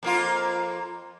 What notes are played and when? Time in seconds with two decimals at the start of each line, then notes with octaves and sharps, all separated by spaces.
0.03 F2 A#3 F4